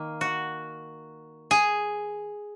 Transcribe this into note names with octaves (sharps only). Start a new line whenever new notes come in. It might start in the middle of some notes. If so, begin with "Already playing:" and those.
Already playing: D#3 A#3
F#4
G#4